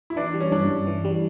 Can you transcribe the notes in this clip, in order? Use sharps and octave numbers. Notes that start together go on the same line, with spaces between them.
E4
E3 D4
G3
C#4
G2 D4
G2
E3
G3